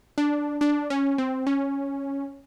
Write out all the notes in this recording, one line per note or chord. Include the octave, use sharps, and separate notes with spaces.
D4
D4
C#4
C4
C#4